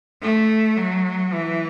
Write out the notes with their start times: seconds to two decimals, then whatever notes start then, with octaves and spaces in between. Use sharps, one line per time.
0.21 A3
0.77 F#3
1.33 E3